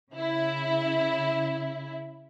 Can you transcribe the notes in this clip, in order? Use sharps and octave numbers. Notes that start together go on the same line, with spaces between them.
C#3 E4